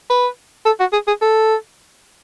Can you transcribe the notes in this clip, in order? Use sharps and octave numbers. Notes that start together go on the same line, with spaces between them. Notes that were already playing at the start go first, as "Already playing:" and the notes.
B4
A4
F#4
G#4
G#4
A4